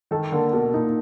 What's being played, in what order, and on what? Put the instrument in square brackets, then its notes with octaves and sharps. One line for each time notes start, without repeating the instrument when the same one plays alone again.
[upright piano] D#3 [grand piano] A4
[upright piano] D3 [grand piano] A#3
[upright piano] B2 [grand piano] A#3
[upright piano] A#2 [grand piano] D#4